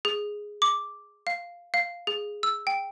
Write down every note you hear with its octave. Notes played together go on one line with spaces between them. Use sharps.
G#4
D6
F5
F5
G#4
E6
G5